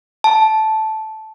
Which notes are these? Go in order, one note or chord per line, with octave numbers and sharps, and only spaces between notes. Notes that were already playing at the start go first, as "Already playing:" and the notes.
A5